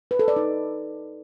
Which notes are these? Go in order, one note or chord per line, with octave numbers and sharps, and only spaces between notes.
B4
A4
D5
D#4